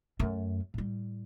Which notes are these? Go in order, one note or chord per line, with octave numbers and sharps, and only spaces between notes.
F#2 A3
A2 G3